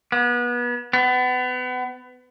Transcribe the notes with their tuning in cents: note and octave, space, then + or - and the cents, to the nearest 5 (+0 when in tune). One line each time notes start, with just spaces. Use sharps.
B3 -30
B3 +30